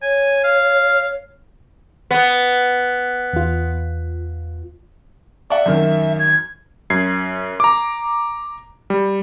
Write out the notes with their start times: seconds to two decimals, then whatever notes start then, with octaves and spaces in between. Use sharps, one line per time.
0.02 C#5 G#5
0.44 F5
2.11 B3
3.33 E2 F4
5.50 D5 E5 F#5
5.66 F#2 D#3
6.19 G#6
6.90 F#2 G#6 C7
7.60 A#5 D6
8.90 G3